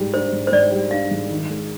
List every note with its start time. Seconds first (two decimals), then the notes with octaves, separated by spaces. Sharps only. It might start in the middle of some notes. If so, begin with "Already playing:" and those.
Already playing: G#2 G3
0.13 D4 C5
0.33 G#2
0.47 C5
0.52 G#2 D5
0.72 G3
0.91 D4 F5
1.11 G#2
1.31 D#3
1.50 G#3